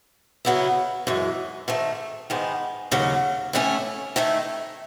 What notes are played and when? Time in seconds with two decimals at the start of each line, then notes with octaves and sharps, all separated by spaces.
0.45 C#3 F#3 B3 E4
1.07 F#2 E3 G#3
1.68 G#2 D#3 A3
2.30 G#2 D#3 G#3 B3
2.92 D#2 C#3 F#3
3.53 A2 E3 A3 C#4 E4
4.16 D#3 A3 E4